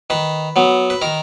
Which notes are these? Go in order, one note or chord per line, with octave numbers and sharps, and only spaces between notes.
D#3 B4
F#3 B3
B4
D#3 A#4